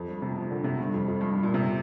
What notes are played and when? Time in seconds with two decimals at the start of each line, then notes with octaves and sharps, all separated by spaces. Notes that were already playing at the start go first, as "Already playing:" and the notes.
Already playing: F2
0.08 G2
0.22 C3
0.36 F3
0.51 D3
0.64 C3
0.79 G2
0.94 F2
1.08 F2
1.21 G2
1.32 G2
1.43 A#2
1.54 C3